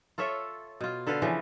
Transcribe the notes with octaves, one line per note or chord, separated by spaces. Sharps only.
F4 A4 C#5 E5
B2 F4
D3 A4 B4 F5
C#3 E3 F3